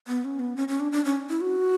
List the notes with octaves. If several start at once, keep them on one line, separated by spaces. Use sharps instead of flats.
B3
C#4
B3
C#4
C#4
D4
D4
C#4
E4
F#4